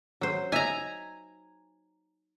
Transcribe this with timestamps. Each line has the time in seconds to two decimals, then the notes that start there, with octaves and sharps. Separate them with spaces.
0.21 F#3 C5
0.52 D#4 E5 G#5 A#5